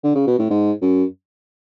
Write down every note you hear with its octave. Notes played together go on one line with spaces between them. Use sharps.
D3
C#3
B2
A2
G#2
F#2